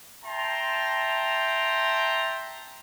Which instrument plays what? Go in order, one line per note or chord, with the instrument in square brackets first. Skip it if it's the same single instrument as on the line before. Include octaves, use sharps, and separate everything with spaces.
[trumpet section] E5 G5 A5 A#5 C6